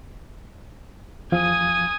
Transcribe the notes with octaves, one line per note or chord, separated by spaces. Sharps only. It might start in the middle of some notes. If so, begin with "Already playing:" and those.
E2 F3 F5 G#5 D#6